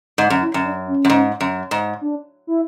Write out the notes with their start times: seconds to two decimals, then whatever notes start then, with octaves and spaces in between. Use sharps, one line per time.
0.18 G#2
0.30 F#2
0.41 E4
0.54 F#2
0.64 D4
0.87 C#4
1.05 F#2
1.10 G#2
1.41 F#2
1.71 G#2
2.01 D4
2.47 E4